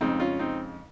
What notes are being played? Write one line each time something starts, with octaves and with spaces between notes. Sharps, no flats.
F2 C#3 G#3 C4 D#4
C#4 F4
C4 D#4